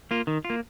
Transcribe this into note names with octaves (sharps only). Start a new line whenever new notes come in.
A#3 F4
D#3
F4
A#3